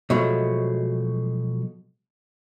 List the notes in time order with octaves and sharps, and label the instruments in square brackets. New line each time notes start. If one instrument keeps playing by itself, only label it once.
[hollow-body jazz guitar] B2 F3 F#3 G#3 A3